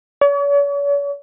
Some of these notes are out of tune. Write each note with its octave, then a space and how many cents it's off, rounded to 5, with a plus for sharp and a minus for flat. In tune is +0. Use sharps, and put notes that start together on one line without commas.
C#5 +45